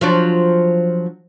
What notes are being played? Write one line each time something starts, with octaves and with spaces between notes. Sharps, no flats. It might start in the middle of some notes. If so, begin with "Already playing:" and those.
F3 F#3 D4